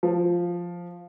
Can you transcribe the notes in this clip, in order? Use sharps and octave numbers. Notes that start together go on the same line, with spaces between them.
F3